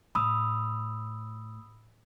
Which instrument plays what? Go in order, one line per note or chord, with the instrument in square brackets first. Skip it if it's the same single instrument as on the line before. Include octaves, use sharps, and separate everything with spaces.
[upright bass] A2 [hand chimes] B5 D#6 E6